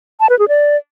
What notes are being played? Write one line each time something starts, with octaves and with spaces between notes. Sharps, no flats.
A5
B4
G#4
D5